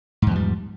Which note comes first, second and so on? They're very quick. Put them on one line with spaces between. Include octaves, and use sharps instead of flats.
G#2 E2 F3 G3